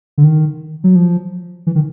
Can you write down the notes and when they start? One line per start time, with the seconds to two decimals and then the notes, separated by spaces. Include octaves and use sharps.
0.18 D3
0.24 D#3
0.84 F#3
0.95 F3
1.67 E3
1.75 D#3